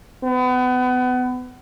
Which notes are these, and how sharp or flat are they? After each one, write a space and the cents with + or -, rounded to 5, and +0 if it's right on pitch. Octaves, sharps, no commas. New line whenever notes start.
B3 +30